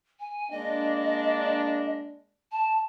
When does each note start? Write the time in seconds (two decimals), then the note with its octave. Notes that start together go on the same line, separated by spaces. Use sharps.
0.20 G#5
0.51 G#3 A#3 D4 D#5
2.52 A5